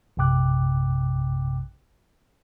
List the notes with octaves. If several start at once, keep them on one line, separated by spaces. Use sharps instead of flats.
A#1 F#2 C3 G5 D6 F#6